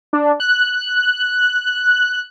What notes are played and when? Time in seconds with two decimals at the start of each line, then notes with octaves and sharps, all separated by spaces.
0.13 D4
0.40 F#6